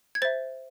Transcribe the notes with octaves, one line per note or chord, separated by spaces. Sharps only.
G#6
C5 E5 A6